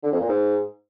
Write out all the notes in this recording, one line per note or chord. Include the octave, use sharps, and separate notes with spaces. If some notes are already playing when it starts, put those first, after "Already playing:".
D3
F2
A#2
G#2